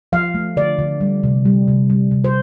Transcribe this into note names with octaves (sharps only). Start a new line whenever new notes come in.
F3 F5
A3
D3 D5
D3
G3
C3
G3
C3
G3
C3
C5